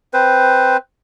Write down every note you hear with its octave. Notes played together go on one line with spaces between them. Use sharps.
C4 B4 C5